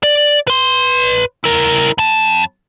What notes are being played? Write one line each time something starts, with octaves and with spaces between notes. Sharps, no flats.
D5
B4 C6
E4 A#4
F2 A5